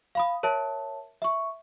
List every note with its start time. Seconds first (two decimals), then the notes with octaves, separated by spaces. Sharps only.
0.15 F5 B5 D#6
0.43 A#4 C#5 E5 A5
1.22 E5 C#6